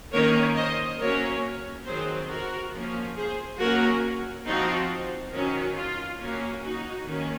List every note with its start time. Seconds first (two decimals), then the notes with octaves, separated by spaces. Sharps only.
0.13 D#3 A#3 C#4 A#4 C#5
0.56 C5 D#5
0.99 F#3 A#3 C#4 A#4 C#5
1.86 D#3 F#3 C4 G#4 C5
2.29 F#4 A#4
2.73 F3 A#3 C#4
3.16 G#4 C5
3.60 F#3 A#3 C#4 F#4 A#4
4.46 F3 C4 D#4 F#4
5.33 D#3 F#3 C#4
5.76 F4
6.20 F#3 A#3 C#4
6.64 D#4 F#4
7.06 D#3 A#3 C#4